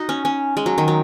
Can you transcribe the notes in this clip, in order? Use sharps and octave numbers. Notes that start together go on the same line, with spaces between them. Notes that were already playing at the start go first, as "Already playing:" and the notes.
Already playing: D#4 F#4
C#4
C#4
G#3
F#3
D#3
F#3